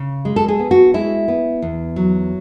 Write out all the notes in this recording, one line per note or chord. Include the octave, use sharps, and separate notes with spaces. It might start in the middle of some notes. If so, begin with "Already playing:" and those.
Already playing: C#3
G#3
A4
G#4
B3
F#4
G#3 E4
B3
E2
F#3